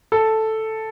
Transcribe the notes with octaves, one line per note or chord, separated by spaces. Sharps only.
A4